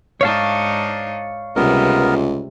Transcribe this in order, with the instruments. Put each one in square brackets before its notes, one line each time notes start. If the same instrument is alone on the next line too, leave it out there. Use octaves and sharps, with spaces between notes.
[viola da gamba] G#2 D4 D#4 [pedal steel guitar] C#5 F5 A5
[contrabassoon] C#2 [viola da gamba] C3 G3 [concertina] B3 A#4